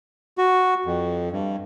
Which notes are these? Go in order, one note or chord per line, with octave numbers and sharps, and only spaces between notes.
F#4
F2
G2